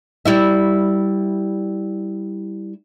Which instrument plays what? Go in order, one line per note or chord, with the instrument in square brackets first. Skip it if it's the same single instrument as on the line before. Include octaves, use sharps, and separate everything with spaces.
[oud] G3 E4 E5